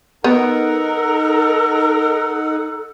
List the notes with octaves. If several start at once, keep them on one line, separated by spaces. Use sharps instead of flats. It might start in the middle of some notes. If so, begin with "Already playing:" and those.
B3 D#4 A4 A#4 F#5